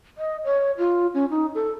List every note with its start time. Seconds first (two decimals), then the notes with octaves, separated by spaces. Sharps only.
0.18 D#5
0.44 C#5
0.78 F4
1.14 C#4
1.30 D#4
1.55 A4